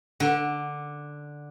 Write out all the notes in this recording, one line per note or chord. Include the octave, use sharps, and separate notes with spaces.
D3